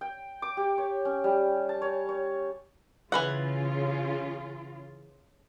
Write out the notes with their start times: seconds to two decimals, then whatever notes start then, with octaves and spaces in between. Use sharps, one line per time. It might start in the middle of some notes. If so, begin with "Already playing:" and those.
0.01 G5
0.42 D6
0.57 G4
0.78 C#5
1.05 C#4
1.24 G3
1.69 A5
1.82 C#5
2.09 C#5
3.12 C#3 E3 F4 B4 F#5